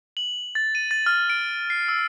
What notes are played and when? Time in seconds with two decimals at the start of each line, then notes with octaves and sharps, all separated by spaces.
0.17 F#7
0.55 A6
0.75 D#7
0.91 A6
1.06 F6
1.30 D7
1.70 C7
1.88 E6